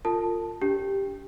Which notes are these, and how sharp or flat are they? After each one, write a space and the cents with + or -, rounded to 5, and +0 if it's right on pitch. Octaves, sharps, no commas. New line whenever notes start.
F4 +5 A#4 -45 A5 +0
D4 -45 G4 +0